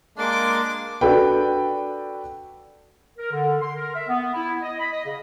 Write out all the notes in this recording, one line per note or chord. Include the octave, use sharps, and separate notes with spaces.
G#3 A#3 D4 C6 D6
D4 F#4 A4 B4 G5
A#4
D3
C6
A#4
E5
B3
E4
D#5
B5
D#5
C#3